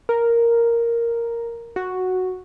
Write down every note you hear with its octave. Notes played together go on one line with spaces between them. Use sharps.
A#4
F#4